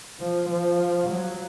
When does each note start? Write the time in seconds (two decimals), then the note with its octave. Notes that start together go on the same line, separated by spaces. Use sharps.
0.20 F3
0.50 F3
1.10 F#3